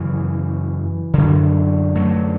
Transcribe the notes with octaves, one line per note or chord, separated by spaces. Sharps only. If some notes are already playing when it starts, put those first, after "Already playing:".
Already playing: F#2 C#3 E3
F#2 D3
F#3 A3